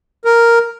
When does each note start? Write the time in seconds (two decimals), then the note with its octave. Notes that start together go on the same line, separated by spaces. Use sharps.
0.25 A#4